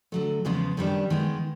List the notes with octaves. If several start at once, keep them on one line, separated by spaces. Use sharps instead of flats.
D3 F#3 A3
E2 C#3 F3 G#3 B3
F#2 D#3 G3 B3 D4
D#3 G#3 B3